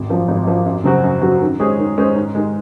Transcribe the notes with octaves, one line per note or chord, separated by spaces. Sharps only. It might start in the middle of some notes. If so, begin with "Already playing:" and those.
Already playing: G#1
F#2 F3
G#1
F#2 F3
F#2
C#3 F#3 C4 F#4
F#2
C#3 F#3 C4 F#4
D#3
G#3 C#4 G#4 C5
D#3
G#3 C#4 G#4 C5
G#2
D#3 G#3